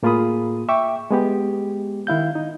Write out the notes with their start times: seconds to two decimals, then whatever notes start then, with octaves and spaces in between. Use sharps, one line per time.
0.03 A2 A#3 F4 G#4 B5 D#6
0.69 E5 G5 C#6 D6
1.11 G#3 B3 G4
2.07 D#3 E4 F5 G6
2.35 D#4